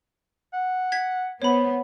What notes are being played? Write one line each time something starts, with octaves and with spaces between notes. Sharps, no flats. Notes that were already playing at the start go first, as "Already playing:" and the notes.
F#5
G#6 B6
B3 C5 C#5 B5